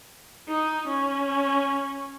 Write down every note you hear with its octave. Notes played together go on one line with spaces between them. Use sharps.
D#4
C#4